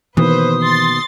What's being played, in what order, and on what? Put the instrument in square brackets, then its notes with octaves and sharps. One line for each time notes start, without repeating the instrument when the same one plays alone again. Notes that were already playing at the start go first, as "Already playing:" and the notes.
[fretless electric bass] B2 D#3 A#3 [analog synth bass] E3 [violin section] B4 C5 [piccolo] D#6
[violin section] C6 A6